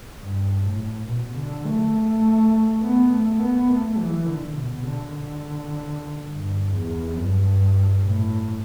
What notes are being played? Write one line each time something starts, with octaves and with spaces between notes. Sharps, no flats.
G2
A2
B2
D3
A3
A3
B3
A3
B3
A3
E3
D3
B2
D3
D3
G2
E2
G2
A2